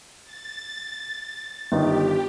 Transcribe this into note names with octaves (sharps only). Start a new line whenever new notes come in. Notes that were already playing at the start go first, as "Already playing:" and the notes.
A6
G1 D#3 D#4 G4